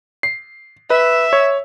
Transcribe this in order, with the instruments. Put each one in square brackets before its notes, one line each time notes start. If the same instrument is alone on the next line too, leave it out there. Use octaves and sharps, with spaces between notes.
[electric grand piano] C7
[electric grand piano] B4 [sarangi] E5
[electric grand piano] C#5